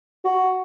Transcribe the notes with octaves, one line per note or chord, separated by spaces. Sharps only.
F#4